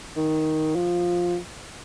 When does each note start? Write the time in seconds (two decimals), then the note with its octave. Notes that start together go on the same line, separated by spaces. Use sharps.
0.17 D#3
0.76 F3